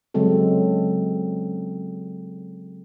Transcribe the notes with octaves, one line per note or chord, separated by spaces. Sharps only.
C#3 F#3 G#3 C4 A4